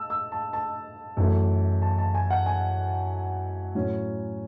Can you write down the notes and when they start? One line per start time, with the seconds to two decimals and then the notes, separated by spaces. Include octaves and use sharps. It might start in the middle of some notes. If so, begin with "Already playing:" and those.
Already playing: A5 E6
0.10 E6
0.32 A5
0.53 A5
1.17 F#2 E3 A3
1.82 A5
1.98 A5
2.15 G#5
2.31 F#5
2.46 G#5
3.75 A2 F#3 C#4 E4